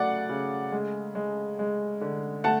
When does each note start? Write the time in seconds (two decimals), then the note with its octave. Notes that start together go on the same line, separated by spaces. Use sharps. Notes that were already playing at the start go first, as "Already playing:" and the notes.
Already playing: C#3 F#3 A3 D5 F#5
0.29 C#3
0.72 G#3
1.15 G#3
1.59 G#3
2.01 D3
2.44 A3 F#5 A5